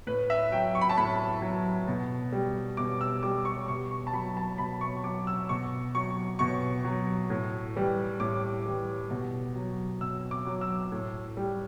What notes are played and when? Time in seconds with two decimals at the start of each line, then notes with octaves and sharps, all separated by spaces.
0.07 A2 B4
0.30 E5
0.52 F#3 G5
0.75 C#6
0.81 B5
0.89 A5
0.97 A2 B5
1.42 F#3
1.87 B2
2.32 G3
2.77 B2 D6
3.01 E6
3.23 G3 D6
3.45 C#6
3.68 B2 C#6
3.91 C#6
4.07 A5
4.13 F#3 B5
4.37 A5
4.58 B2 B5
4.81 C#6
5.04 F#3 D6
5.27 E6
5.49 B2 C#6
5.95 F#3 C#6
6.39 B2 C#6
6.84 F#3
7.30 A2
7.75 E3 G3
8.20 A2 D6
8.66 E3 G3
9.10 B2
9.55 F#3
10.01 B2 E6
10.31 D6
10.46 F#3
10.61 E6
10.92 A2
11.37 G3